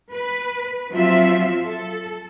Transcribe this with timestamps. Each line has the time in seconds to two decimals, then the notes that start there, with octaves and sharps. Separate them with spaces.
0.13 B4
0.90 F3 F#3 C4 F4 E5
1.66 A4